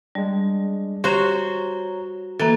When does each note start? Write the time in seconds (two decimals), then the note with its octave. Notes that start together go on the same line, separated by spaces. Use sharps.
0.15 G3 G#3 D4
1.04 F#4 G4 C5 C#5 A#5
2.40 E3 A#3 A4